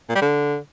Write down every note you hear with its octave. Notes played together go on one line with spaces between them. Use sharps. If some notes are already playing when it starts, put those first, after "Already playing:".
A#2
G3
D3